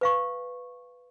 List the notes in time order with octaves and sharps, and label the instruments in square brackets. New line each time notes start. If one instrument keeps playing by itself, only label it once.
[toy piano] B4 F5 C#6